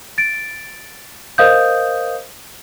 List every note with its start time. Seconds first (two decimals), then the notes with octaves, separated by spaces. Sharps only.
0.18 A6 D7
1.38 A#4 C5 D#5 F5 D#6 G6